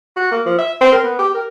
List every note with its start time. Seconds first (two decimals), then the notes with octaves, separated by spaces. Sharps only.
0.16 F#4
0.31 A#3
0.46 F3
0.58 E5
0.81 C4
0.92 A#4
1.04 B3
1.19 G4
1.35 A#4